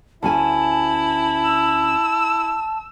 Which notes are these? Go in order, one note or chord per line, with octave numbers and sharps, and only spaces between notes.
D2 C#4 E4 G#5 A5
E6